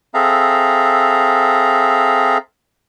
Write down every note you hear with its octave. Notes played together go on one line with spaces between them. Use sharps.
C4 G#4 A4 E5 F5 A#5